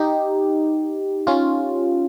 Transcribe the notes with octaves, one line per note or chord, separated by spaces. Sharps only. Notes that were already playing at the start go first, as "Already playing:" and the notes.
Already playing: D#4 G4
C#4 F4